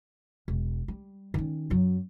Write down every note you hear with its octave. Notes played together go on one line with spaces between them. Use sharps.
E1
G3
D#3 C#4
F#2 F#3